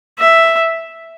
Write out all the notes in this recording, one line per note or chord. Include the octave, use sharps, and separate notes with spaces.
E5